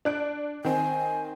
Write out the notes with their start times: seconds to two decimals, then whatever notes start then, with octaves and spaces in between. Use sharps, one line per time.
0.05 D4 F#6 D7
0.64 D#3 C4 G#5